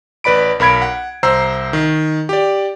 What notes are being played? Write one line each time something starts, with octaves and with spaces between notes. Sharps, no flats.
A1 B4 D5 B5 D7
B1 A#4 B5 G#6 D7
F#5
C2 C5 A#5 E6 C7
D#3
G4 D5